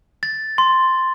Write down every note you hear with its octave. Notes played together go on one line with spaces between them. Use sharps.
A6
C6